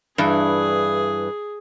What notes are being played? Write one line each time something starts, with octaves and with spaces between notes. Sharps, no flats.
G2 E3 G#4